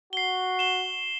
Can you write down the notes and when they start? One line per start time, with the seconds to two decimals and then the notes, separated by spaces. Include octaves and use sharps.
0.13 F#4 C7 G7
0.59 E7 G7